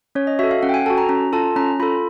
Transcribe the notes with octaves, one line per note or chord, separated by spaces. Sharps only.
C#4 C#5
D#5
F#4 A4 E5
F5
C#4 F#5
G5
G#5
F#4 A4 A5
A#5
C#4 A#5
F4 A4 A5
C#4 A#5
F4 A4 B5